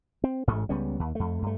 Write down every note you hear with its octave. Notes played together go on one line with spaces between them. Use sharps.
C4
A1 G#2 A3
C#2 G3 B3 C#4
D#2
F2 A3
G2 A3